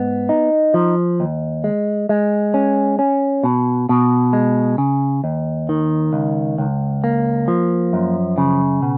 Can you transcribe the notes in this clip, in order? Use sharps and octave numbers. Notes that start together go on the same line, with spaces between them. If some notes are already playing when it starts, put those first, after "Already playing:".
Already playing: G#2 B3
D#4
F3
D#2
G#3
G#3
C#4
C#4
B2
B2
G#3
C#3
D#2
D#3
C#2
C#2
A#3
F3
F#2
C#3
B2